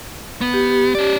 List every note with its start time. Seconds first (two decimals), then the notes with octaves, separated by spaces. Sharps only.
0.41 B3
0.54 G4
0.95 C#4 D5